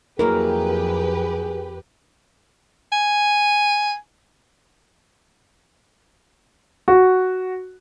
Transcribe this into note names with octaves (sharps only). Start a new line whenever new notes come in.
F2 F#3 A#3 E4 G4 G#4 A#4 B4
G#5
F#4